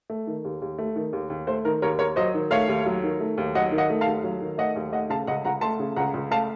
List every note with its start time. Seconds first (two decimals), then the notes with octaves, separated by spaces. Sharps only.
0.10 A3
0.27 D#3
0.45 D#2
0.62 D#2
0.78 A3
0.96 D#3
1.13 D#2
1.30 D#2
1.47 A3 C5
1.65 D#3 A#4
1.82 D#2 A#4 C#5
1.99 D#2 A#4 C#5
2.16 F#3 C5 D#5
2.34 D#3
2.51 A3 C#5 F5
2.69 D#2
2.86 F#3
3.04 D#3
3.20 A3
3.38 D#2
3.55 F#3 D#5 F#5
3.72 D#3
3.78 D#5 F#5
3.90 A3
4.01 F5 A5
4.07 D#2
4.24 F#3
4.41 D#3
4.58 A3 D#5 F#5
4.76 D#2
4.92 A3 D#5 F#5
5.10 C#3 F5 A5
5.27 C#2 D#5 F#5
5.45 C#2 F#5 A#5
5.61 A3 A5 C6
5.79 C#3
5.96 C#2 F#5 A#5
6.14 C#2
6.31 A3 F5 A5